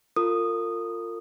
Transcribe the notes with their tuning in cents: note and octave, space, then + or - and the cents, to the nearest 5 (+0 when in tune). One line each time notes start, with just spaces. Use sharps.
F4 +0 A#4 -40 D#6 -15